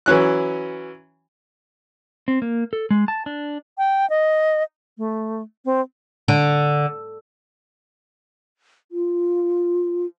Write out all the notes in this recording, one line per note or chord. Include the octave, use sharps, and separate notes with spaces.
E3 F#3 C#4 F#6
C4
A#3
A4
G#3
A5
D4
G5
D#5
A3
C4
D3
F4